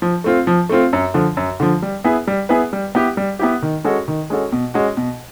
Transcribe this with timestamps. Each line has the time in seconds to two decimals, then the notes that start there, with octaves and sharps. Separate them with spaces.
0.02 F3
0.24 A3 C4 F4
0.47 F3
0.69 A3 C4 F4
0.93 F#2
1.14 D3 F3
1.37 F#2
1.60 D3 F3
1.82 G3
2.04 B3 E4 G#4 B4
2.27 G3
2.49 B3 E4 G#4 B4
2.73 G3
2.95 B3 E4 G4
3.17 G3
3.39 B3 E4 G4
3.62 D#3
3.84 G#3 C#4 F#4 A4
4.08 D#3
4.30 G#3 C#4 F#4 A4
4.52 B2
4.74 G#3 C#4 F#4
4.97 B2